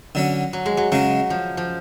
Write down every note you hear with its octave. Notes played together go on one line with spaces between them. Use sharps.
D3 F#3 C#4
F#3
G#3
F#3
C#3 F#3 G#3 C#4
F3
F3